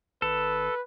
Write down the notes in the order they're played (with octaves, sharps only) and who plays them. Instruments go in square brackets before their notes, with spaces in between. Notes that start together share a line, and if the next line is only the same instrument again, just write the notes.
[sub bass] G#1 [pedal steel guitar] A4 [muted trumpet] B4